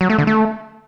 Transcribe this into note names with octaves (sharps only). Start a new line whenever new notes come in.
F#3
A3
D3
A3